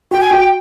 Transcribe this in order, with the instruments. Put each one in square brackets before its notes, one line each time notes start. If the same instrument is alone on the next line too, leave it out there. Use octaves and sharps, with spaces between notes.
[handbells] F#4 [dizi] G5
[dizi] G#5
[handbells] F#4 [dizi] G5